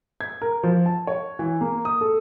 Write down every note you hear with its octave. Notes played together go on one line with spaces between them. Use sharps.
G#6
A#4
F3
A5
C#5
E3
A#3
D#6
A4